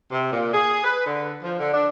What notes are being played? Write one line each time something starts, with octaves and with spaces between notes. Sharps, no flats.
C3
A#2
G#4
B4
D3
F3
D3
D4